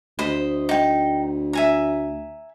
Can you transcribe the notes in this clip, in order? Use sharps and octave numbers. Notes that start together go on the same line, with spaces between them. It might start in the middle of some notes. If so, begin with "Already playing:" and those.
D2 C5 D#5 B5
D#4 G5
E5 G#5 A#5